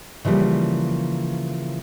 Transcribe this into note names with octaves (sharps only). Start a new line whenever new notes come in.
C#3 E3 F3 G3 A#3